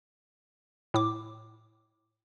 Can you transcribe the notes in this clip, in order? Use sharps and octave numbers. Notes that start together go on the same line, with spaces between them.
A2 D6